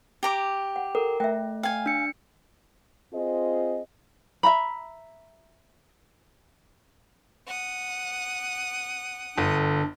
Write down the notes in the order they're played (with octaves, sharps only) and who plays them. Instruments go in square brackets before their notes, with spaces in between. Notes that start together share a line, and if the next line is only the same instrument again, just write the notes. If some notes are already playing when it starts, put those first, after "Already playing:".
[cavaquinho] G4 A#5 D6
[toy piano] F#5
[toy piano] A4 [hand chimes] A#4
[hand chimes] A3 [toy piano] E5 G5
[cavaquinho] F5 G#5 [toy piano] G5
[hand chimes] D4 C#7
[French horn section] C4 F4 G#4 C5 D#5
[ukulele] E5 A#5 B5
[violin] F#5 D#6
[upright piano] G1 [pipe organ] D3 A4